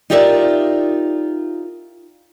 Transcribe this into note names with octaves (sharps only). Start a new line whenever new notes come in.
D#4 F4 G4 A#4 D5 E5